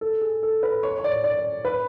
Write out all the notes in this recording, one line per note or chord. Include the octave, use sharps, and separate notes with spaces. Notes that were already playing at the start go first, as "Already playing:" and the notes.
A4
G#4
A4
B4
C#5
C#5
D5
D5
B4